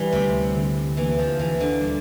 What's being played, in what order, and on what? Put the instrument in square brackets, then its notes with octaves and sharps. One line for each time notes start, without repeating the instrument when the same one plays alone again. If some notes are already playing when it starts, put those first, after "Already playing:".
Already playing: [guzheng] E3 [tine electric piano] G3
[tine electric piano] D2 [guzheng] C3
[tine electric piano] D3
[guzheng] E3 [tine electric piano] A#3
[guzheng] F3
[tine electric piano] D2 [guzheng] E3
[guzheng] D3
[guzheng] A#2 [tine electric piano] G3